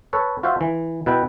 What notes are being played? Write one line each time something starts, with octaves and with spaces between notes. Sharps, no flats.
A4 B4 C#5
F4 F#4 C5 E5
E3
B2 E4 B4 E5 G5